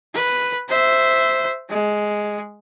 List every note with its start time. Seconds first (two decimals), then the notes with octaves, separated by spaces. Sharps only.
0.15 B4
0.69 C5 E5
1.70 G#3